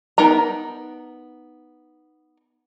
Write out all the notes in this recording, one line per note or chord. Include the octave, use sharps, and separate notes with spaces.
B3 D#4 A#4 A#5